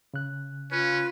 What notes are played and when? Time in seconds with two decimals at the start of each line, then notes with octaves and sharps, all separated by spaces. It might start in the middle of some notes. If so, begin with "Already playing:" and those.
0.14 C#3 F#6
0.72 C#4 F4 B4